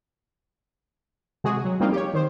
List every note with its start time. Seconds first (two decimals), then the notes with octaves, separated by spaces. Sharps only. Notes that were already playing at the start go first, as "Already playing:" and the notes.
1.44 C3 G#3 F#4 G#4
1.65 F#3
1.80 F3 G3 A#3 C4 D#4 F4
1.92 G4 C#5
2.14 D#3 C5